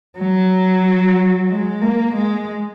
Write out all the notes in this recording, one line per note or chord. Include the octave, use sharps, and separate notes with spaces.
F#3
G#3
A#3
G#3